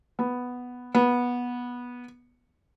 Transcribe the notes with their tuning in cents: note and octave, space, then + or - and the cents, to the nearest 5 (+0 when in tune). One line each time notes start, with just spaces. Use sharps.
B3 +0
B3 -15